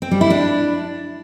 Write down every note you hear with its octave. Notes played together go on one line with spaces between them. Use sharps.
C4
G3
E4
D4